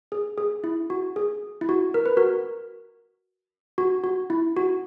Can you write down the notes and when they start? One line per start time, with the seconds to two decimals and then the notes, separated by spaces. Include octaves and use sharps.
0.12 G#4
0.38 G#4
0.64 E4
0.90 F#4
1.16 G#4
1.61 E4
1.69 F#4
1.94 A#4
2.06 B4
2.17 F#4 A#4
3.78 F#4
4.04 F#4
4.30 E4
4.57 F#4